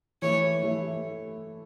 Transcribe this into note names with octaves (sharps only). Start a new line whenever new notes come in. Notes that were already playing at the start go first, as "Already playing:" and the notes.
E3 A3 E4 C#5
E3 A3 E4